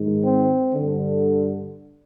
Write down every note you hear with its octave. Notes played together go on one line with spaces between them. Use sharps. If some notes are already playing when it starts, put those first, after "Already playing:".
Already playing: G#2 D#3
C4
G2 D3